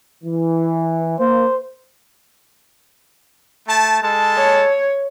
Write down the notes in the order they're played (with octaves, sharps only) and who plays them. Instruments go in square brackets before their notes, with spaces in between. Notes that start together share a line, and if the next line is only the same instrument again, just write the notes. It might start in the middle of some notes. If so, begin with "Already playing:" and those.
[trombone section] E3
[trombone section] A#3 [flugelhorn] C5
[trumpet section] A3 A5
G#3 A4 A5
[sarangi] C#5